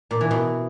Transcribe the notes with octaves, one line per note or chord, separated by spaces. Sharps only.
A#2
E3
B2